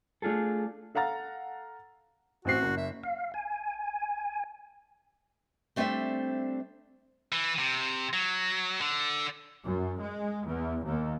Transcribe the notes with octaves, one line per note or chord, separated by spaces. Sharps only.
A3 D4 F4 G#4 A4
A4 F5 F#5 A#5 A6
A1 C4 F#4 C7
F#1
E5
F5
G#5
G3 A3 C4 D4 C5 E5
E3
C3
F#3
D3
F#2
G#3
E2
D#2